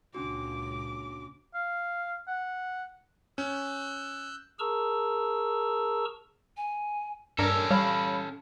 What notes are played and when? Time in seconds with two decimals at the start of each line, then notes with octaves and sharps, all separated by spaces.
0.15 C#2 A#2 C#3 C#4 D4 F#4 D6
1.54 F5
2.28 F#5
3.38 C#4 E6 F#6 G6
4.59 G#4 A#4 A5 A#5 C#6 E6
6.57 G#5
7.39 G2 C#4 D4 A4 A#4 E6
7.71 G3 C#5 F5 B5